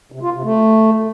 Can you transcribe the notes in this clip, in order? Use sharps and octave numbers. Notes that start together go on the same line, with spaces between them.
C3
F4
C3
A3